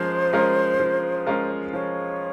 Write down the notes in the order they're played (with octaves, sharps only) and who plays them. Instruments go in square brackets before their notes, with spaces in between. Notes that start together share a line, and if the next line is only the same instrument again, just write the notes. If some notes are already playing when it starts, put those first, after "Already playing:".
Already playing: [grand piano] F3 G#3 C#4 F4 A#4 [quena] C5
[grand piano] G#3 C#4 F4 A#4
F3
G#3 C#4 F4 A#4
[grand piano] F3 [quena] C#5